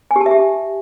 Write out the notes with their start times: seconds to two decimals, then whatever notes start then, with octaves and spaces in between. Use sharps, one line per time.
0.11 G#5
0.16 G4
0.21 A5
0.26 E5
0.31 G4